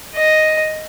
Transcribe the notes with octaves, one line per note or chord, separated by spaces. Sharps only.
D#5